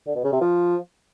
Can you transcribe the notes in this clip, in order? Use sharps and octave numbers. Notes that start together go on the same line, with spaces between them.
D3
B2
C#3
C3
F3